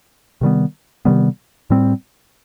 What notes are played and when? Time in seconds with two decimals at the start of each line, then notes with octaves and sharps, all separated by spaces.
0.41 C3 D#3 G3 B3
1.05 C3 D#3 G3 B3
1.70 A2 G3 C4